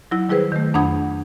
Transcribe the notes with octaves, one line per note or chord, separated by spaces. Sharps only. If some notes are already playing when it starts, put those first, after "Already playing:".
F#3 E4
D#3 G3 E4 G#4 B4 C5
D#3 A3
F2 D4 F#5 B5 D#6 G#6